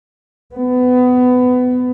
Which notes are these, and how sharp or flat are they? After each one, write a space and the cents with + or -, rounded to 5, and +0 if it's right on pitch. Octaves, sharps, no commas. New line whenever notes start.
B3 +20